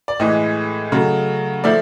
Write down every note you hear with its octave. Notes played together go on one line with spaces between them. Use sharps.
D5
A2 E3 G#3 D#5
C#3 F#3 A3
F3 A3 D5 E5